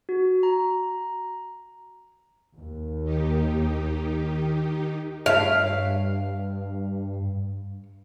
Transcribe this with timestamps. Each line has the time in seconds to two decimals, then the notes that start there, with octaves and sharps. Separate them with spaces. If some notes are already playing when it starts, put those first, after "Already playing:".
0.09 F#4
0.43 A#5
2.58 D#2
3.03 D#3 D#4 G4
5.26 G2 C#5 E5 F5